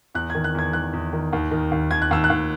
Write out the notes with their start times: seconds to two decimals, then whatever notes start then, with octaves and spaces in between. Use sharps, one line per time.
0.15 E2 F#6
0.30 G#6
0.35 D#3
0.44 F#6
0.55 E2 G#6
0.73 D#3 F#6
0.93 E2
1.13 D#3
1.33 D#2
1.51 D#3
1.71 D#2
1.91 D#2 G#6
2.02 F#6
2.11 D#2 E6
2.24 F#6
2.30 D#2